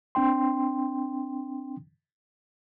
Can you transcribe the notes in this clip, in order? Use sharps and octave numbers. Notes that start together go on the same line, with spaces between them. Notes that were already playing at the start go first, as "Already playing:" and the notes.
C4 D4 G5 C6